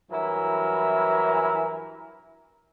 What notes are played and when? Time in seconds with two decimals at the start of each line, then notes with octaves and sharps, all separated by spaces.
0.11 G2 E3 F#3 E4 A#4 E5